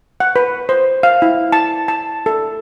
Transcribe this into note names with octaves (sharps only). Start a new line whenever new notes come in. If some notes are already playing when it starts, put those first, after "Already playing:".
F#5
B4
C5
F5
E4
A5
A5
A4